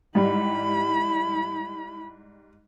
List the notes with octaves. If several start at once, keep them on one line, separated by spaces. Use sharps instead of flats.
G#2 G3 E4 B5